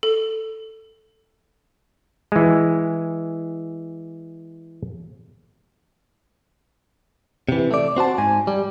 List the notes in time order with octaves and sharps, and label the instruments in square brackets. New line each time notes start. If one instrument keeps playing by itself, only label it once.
[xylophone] A4
[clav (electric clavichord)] E3 G#3
[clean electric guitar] C3 E3
A3 D5
C4 F#4 C5 A5
G#2 G#5
G3